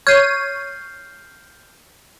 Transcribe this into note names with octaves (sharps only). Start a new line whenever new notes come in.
C#5 F6 G6 C7 D#7